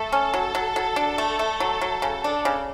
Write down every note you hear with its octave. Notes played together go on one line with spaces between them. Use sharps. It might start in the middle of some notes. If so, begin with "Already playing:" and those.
Already playing: A3 A4
C#4
F#3
F#3
F#3
D4
A3
A3
F#3
F#3
C#3
D4
C#3